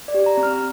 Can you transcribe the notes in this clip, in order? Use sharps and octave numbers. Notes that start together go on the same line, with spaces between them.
D5
G4
A#5
C4
F6